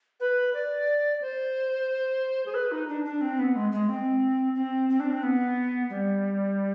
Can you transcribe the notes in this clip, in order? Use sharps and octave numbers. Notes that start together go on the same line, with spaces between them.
B4
D5
C5
G#4
B4
D#4
D4
D4
C4
B3
G#3
G#3
C4
C4
C4
D4
C4
B3
G3